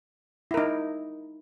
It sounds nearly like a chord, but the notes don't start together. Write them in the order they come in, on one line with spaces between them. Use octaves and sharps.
E4 A#4 D#4